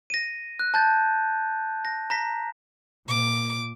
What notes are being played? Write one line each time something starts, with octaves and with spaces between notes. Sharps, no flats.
A#6 D#7
F#6
A5 G6 A6
A#6
A#5 A#6 B6
A#2 D6